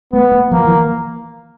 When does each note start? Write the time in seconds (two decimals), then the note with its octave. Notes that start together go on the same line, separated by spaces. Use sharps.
0.13 A3 B3
0.32 A#3
0.51 F3 A#3
0.65 E3